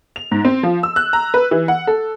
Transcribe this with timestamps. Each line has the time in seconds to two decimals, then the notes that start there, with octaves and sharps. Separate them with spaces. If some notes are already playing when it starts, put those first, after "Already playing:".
0.16 F7
0.31 G#2
0.45 C4
0.63 F3
0.83 E6
0.96 F#6
1.13 A#5
1.34 B4
1.51 E3
1.68 F#5
1.87 A4